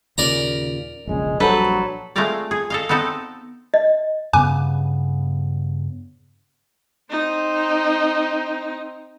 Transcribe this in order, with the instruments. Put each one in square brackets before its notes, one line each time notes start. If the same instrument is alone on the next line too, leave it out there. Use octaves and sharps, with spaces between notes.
[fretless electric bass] D#2 A#2 C#3 [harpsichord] A#4 D5 A#5
[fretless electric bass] E1 A#1 C#3 [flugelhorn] G#3
[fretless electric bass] A#1 G3 D4 [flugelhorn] F#3 [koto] A4 B4 C5
[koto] G#3 A3 C4 F4 A#4 D5
G#4
A4 D#5 F5
B3 C4 D#4 A4 B4
[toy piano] D#5
[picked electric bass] G2 C#3 B3 [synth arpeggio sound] G#5 D6 F#6
[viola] C4 D#4